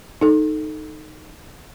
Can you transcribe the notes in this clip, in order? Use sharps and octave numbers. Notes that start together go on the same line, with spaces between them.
D#4 A4